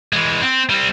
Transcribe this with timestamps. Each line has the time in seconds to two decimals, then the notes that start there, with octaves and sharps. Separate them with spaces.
0.13 E3 G#3
0.41 C4
0.69 G3 C4